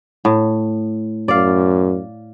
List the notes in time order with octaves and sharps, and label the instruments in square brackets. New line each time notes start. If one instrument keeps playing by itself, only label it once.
[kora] A2
[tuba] F#2 [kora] D5 F5